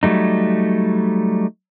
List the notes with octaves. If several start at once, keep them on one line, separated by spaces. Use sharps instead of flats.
F#3 G3 A3 D#4